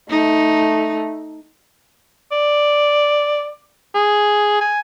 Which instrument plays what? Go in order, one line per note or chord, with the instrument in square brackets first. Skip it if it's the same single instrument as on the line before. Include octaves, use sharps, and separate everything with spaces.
[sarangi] A3 [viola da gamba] D#4
[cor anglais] D5
G#4
G#5